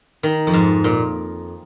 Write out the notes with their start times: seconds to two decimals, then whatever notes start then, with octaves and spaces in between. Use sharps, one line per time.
0.23 D#3
0.47 F2
0.53 G#2
0.84 A#2